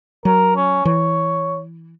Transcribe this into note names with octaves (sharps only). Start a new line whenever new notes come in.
F#3 A#4
C#4
E3 C#5